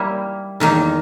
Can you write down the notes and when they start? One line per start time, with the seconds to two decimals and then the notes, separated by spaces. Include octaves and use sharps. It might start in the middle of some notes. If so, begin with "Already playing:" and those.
Already playing: G3 A#3 E4
0.60 E2 D#3 A#3 D#4